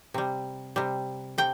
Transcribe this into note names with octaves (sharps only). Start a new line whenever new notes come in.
C3 G3
C3 G3
C3 G5